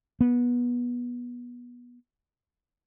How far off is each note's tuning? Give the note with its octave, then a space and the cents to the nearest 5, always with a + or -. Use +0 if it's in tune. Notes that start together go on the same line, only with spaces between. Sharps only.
B3 -20